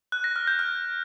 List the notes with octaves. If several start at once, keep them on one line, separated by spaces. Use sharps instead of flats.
F#6
A#6
F6
G6
F6